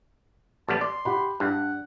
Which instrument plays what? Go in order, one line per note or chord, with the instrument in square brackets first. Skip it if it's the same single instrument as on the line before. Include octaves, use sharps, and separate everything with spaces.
[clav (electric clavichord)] A1 G3 B3 [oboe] A5
[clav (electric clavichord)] D5 [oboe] C6
[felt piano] G4 F#5 B5
[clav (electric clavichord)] G2 [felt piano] D4 [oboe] F#5